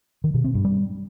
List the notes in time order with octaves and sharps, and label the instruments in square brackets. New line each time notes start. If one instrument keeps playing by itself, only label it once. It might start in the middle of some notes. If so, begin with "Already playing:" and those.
[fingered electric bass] D#3
B2
C4
G2
G3